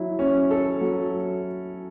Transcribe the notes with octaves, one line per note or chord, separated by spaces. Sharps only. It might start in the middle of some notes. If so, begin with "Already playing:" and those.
Already playing: F#3 E4
C#4
A4
F#3